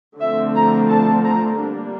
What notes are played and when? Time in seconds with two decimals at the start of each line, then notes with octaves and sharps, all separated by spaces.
0.20 D3 F3 A3 C4 E5
0.55 A#5
0.89 A5
1.24 A#5
1.58 G3 A#3 D4